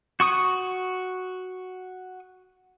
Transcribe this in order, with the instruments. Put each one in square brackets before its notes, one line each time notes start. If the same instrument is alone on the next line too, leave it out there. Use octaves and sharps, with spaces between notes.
[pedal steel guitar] F#4 C#6 D#6